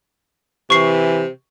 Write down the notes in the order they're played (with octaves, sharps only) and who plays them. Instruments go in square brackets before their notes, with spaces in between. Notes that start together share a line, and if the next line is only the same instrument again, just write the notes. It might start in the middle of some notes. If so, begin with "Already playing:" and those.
[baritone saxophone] C3 [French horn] E3 [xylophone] C#6 C7